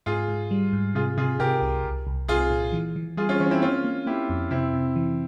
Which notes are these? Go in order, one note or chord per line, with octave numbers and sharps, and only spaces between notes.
G#2 F4 G#4
G#2
G3
G#2
C3 F4 G#4
C3 F4 G#4
C3 G4 A#4
C2
C2
C2
C2 F4 G#4
A#2
E3
E3
G3 F4 G#4
C#4 F4
E3 C#4
C4 E4
A#3 C#4 F4
A#3
A#3 E4 G4
F2
C3 C4 E4
C3
E3